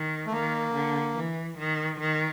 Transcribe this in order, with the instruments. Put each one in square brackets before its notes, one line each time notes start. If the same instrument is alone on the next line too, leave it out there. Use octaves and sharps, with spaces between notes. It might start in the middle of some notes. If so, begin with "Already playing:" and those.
Already playing: [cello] D#3
[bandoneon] A3
[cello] D#3 [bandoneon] A#3
[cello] D3
E3
D#3
D#3